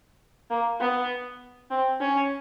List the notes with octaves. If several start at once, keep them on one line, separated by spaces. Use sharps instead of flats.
A#3
B3
C4
C#4